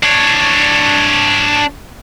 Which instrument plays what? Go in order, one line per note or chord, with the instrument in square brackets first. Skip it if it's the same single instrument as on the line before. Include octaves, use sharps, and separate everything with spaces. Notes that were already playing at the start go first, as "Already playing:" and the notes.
[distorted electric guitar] D4 C#5